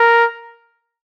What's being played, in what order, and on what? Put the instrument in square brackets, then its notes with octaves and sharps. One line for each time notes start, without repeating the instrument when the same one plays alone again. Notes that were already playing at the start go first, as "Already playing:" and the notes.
Already playing: [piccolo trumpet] A#4